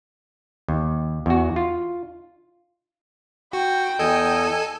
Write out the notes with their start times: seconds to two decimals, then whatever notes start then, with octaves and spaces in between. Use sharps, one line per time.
0.68 D#2
1.26 E2 F#4
1.56 F4
3.53 F#4 G5
3.99 E2 A4 D#5 G#5